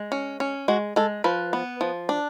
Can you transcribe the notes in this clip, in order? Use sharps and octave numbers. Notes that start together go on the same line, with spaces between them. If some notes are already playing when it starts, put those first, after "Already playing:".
Already playing: G#3
C#4
C#4
G#3 F#4
G#3 A4
F3 B4
B3
F3
D4